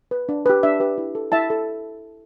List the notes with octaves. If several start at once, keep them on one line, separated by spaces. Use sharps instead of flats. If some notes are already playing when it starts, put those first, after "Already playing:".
B4
D4
G4 B4
D4 E5
G4 B4
E4
A4
E4 E5 A5
A4